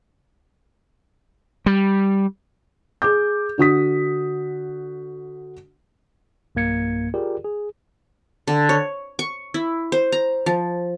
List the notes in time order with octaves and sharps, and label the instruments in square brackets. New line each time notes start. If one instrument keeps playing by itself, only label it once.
[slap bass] G3
[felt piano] G#4 D6 G6
D3 F#4 D#6 B6
[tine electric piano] B1 G2 A#3 G#6 C#7
F4 G4 G#4 A#4 D5
G#4
[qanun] D3
C#5
C#6
E4
C5
A#5
F3